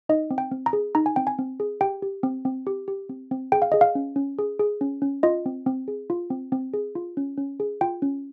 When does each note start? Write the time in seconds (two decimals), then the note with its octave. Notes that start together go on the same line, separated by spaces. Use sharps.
0.09 D#4 D#5
0.31 C4
0.38 G5
0.52 C4
0.66 A#5
0.73 G#4
0.95 D#4 A#5
1.06 G#5
1.16 C4 G5
1.27 G#5
1.39 C4
1.60 G#4
1.81 G4 G5
2.02 G4
2.23 C4
2.45 C4
2.67 G4
2.88 G4
3.09 C4
3.31 C4
3.52 G#4 G5
3.62 F5
3.72 G#4 D#5
3.81 F5
3.95 C#4
4.16 C#4
4.39 G#4
4.60 G#4
4.81 C#4
5.02 C#4
5.23 F4 D#5
5.46 C4
5.66 C4
5.88 G#4
6.10 F4
6.30 C4
6.52 C4
6.74 G#4
6.95 F4
7.17 C#4
7.38 C#4
7.60 G#4
7.81 F4 G5
8.02 C#4